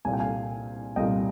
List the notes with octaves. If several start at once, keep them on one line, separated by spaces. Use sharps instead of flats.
C2 A#2 G3 G#5
G5
F5 G#5
C2 A#2 G3 D#5 G5